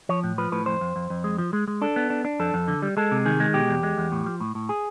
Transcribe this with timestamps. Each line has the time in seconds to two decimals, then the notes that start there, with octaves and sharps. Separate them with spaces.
0.09 F3 C#5
0.24 A2
0.38 F3 B4
0.52 A2 B4
0.66 F2 C5
0.81 F2
0.96 F2
1.10 F2
1.24 G#3
1.38 F3
1.53 G#3
1.68 G#3
1.82 D4 A4
1.96 B3
2.10 D4
2.25 D4
2.40 F2 A4
2.54 F2
2.68 D3
2.82 G3
2.97 G#3 A4
3.11 C3
3.26 D#3 G#4
3.40 G#3
3.54 B2 G4
3.69 E2
3.83 G#3
3.98 E2
4.12 A2
4.26 F3
4.40 A2
4.55 A2
4.69 G#4